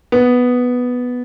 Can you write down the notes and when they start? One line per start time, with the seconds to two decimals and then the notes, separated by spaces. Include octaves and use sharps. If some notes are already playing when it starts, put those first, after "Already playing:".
0.12 B3